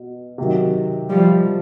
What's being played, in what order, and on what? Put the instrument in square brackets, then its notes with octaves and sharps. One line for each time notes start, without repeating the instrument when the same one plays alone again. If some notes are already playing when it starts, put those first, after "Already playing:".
Already playing: [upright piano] B2
C3 D#3 F#3
[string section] F3 G3